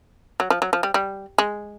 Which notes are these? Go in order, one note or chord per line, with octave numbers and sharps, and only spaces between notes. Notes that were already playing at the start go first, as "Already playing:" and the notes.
F#3
F3
F#3
F3
G3
G3
G#3